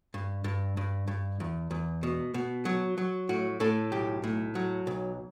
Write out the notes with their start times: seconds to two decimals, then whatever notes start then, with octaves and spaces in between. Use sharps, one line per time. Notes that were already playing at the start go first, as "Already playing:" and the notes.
0.14 G2
0.44 G2
0.77 G2
1.07 G2
1.40 E2
1.71 E2
2.03 B2
2.34 B2
2.65 F#3
2.98 F#3
3.29 A2 F#4
3.60 A2 A4
3.92 B1 G4
4.24 A2
4.55 F#3
4.87 B1